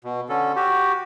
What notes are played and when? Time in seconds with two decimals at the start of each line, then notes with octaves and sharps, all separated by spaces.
0.04 B2
0.29 D3 C#4 A4
0.56 F#4 G4